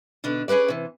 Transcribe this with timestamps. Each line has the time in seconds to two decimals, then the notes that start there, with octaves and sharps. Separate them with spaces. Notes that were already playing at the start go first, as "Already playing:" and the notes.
0.24 B2 D3 D4 D#4
0.48 C#4 G#4 A4 B4 D5
0.68 C3 E3